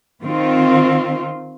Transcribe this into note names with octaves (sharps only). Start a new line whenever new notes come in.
D#3 C4 F4